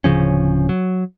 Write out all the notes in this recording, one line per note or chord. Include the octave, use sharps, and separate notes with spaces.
D1 C#3 F3 C#4
F#3